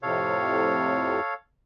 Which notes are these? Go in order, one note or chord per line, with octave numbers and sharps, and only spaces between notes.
F2 A2 C3 A4 C#5 F5